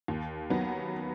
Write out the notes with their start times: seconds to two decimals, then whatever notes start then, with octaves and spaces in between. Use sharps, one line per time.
0.08 D#2
0.50 D#3 F#3 B3